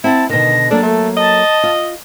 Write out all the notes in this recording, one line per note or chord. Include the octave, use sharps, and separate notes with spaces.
C4 E4 F#5 A5
B2 D3 D#3 A#6
F#3 A#3 D4 A4 A5
A3
D#5 A5
F4